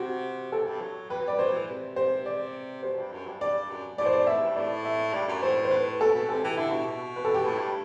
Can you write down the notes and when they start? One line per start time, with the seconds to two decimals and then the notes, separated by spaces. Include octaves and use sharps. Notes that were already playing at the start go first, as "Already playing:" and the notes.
Already playing: C3 F#4
0.52 C3 A4
0.66 G2
0.81 F#3
1.10 G3 B4
1.20 F#3
1.24 G3 D5
1.39 F#3 C5
1.52 E3
1.68 C3
1.96 C3 C5
2.26 D5
2.83 B2 C5
2.98 G2
3.12 F#2
3.26 G2
3.41 G2 D5
3.69 F#2
3.98 A2 D5
4.06 C5
4.13 D5
4.27 A2 E5
4.42 G2
4.56 A2 D5
4.85 E5
5.13 G2 D5
5.28 F#2
5.42 A2 C5
5.65 C5
5.71 B4
6.00 B2 A4
6.15 B2
6.29 C3 A4
6.44 E3 G4
6.57 D3 E4
6.72 B2
6.87 B2
7.16 B4
7.25 A4
7.34 G4
7.45 A2
7.58 G2